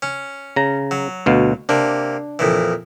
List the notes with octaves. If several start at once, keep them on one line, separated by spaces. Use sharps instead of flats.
C#4
C#3 A#5
F#3
D2 B2 F5
C3 A#3 D4
F2 A#2 E3